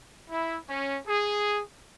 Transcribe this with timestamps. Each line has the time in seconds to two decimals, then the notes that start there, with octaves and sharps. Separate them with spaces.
0.29 E4
0.69 C#4
1.07 G#4